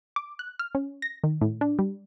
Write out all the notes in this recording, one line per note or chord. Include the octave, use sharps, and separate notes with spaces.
D6
F#6
F6
C#4
A#6
D#3
A2
D4
G3